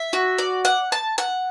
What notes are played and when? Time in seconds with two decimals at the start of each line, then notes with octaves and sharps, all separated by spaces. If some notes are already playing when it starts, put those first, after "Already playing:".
Already playing: E5
0.13 F#4
0.38 D5
0.65 F#5
0.92 A5
1.18 F#5